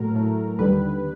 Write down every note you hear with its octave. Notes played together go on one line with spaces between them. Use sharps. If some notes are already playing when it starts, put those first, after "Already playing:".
Already playing: A2 F#3 A3 A#4
A2 F#3 A3
D#2 D3 G3 B4